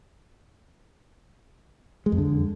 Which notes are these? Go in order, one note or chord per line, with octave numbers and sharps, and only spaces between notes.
G#3
F2
D3